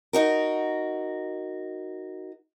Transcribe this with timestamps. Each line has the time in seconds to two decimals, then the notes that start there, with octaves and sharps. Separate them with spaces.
0.13 D#4 F#4 A#4